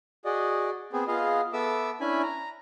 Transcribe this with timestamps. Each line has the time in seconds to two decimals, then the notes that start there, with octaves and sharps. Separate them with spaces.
0.25 F#4 G#4 D5 D#5
0.93 B3 C4 G#4
1.08 B3 F4 G#4 D#5 F5
1.53 B3 A4 E5 D6 E6
2.01 C#4 D4 E4 G#5 B5
2.23 A#5